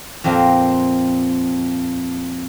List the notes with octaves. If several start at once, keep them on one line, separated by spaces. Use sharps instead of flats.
F2 A#2 A#3 C4 A#4 F5